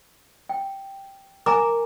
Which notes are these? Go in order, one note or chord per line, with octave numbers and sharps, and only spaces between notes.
G5
A#4 G#5 A#5 D6